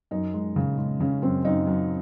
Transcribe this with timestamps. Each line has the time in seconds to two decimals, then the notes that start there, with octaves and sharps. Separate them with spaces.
0.11 F#2 D#4
0.34 G#3
0.56 C#3
0.78 G#3
1.00 C#3 C#4
1.22 F#2 C4
1.45 F#2 D#4
1.67 F#2